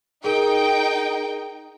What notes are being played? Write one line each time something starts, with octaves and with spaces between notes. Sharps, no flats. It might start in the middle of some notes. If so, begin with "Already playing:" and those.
D#4 G#4 A#4 G5